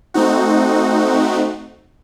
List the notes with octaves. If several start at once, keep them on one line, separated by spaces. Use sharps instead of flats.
A3 C4 D#4 F#4